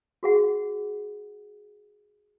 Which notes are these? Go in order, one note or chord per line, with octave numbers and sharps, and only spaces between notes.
F#4 G#4 F#5